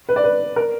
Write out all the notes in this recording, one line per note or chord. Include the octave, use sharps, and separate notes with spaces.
B4
D5
B4
A#4